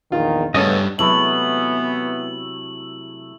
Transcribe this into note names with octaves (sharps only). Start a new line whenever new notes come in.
A#1 E2 D#3 F4
G2 C#3 A3 B3 C#4 A4 D#5
C3 E3 F#3 G#3 A3 B3 E4 F#7